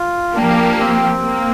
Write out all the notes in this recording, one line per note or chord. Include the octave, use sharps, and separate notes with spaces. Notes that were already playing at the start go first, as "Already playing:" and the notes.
Already playing: F4
F3 A#3 D4 G4
C4
A#3